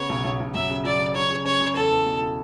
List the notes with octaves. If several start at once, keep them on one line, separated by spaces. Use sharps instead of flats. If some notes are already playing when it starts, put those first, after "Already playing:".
Already playing: C#3 B3 C#5
B1
B1
B1
F#2 E5
C#3
F#3 D5
C#3
C#3 C#5
C#3
C#4 C#5
C#3
E2 A4
E2
B2
E4